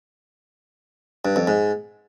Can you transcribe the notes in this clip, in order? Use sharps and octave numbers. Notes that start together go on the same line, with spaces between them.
G2
F2
G#2